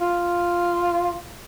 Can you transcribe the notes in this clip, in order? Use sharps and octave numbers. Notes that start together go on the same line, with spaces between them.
F4